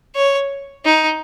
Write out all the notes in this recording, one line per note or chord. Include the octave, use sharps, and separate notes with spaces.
C#5
D#4